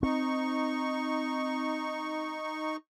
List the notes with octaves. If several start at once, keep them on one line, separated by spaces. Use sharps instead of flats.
C4 D#4 C#6